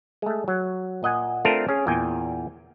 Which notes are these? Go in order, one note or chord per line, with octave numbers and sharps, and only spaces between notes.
G#3 A3
F#3
A#2 D#5 F#5 G#5
A3 C4 D4 F4 A4 A#4
C#4 G#4
E2 A#2 G5 G#5